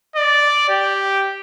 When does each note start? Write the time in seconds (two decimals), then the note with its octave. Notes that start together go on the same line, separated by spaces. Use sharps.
0.16 D5
0.69 G4